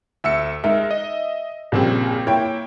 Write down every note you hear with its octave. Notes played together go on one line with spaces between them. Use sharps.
D2 E5 E6 C#7
G#3 D#4 A#4 E5
D#5
A#1 G2 C#3 A#3 C4
A#3 E4 C#5 G5